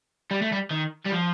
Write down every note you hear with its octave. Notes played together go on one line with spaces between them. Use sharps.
G3
A3
G3
D#3
G3
F3